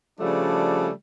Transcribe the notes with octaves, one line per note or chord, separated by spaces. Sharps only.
C#3 F3 G3 A3 D4